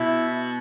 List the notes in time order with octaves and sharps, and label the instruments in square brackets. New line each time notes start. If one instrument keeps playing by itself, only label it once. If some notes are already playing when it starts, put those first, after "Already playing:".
Already playing: [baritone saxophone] B2 [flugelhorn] E4